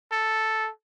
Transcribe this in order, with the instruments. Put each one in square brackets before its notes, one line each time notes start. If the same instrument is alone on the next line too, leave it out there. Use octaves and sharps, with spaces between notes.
[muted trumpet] A4